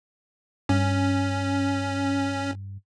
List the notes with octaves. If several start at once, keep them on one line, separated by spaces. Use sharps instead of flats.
G2 C#4